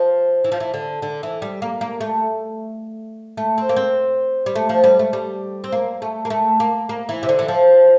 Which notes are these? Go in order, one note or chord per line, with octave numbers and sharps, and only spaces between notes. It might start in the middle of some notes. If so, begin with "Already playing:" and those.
Already playing: F3
E3
F3
E3
D3
D3
E3
G3
A#3
A#3
A3
A3
C4
A#3
C4
G3
A3
F3
G3
A3
G3
C4
A#3
A3
A#3
A3
A#3
A#3
E3
C3
D3
E3
F3